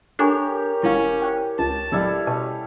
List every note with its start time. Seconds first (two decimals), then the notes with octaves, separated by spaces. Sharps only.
0.19 D4 G4 A4 A#4 C#5 G#5
0.83 E1 C#4 E4 F5
1.22 C5 G5
1.59 C#2 A5
1.92 D1 G3 E4 A4
2.27 B2 C#4 A5